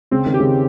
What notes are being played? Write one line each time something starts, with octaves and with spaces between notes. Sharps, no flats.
C#3 C4
D#3
G4
C#3